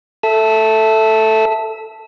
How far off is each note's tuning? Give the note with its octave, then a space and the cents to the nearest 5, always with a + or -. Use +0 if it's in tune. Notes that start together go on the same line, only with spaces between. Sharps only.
A4 +0 E5 +0 E6 -30